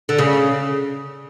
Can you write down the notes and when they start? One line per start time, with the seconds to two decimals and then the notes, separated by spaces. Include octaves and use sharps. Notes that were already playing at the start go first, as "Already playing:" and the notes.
0.09 D3
0.18 C#3